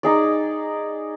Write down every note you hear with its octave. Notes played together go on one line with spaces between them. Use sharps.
D#4 G#4 D5